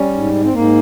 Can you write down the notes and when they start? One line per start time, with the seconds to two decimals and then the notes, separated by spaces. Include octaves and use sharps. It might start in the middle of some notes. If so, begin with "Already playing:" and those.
Already playing: G3 C#4
0.14 G#2
0.44 C4
0.53 G#2 A#3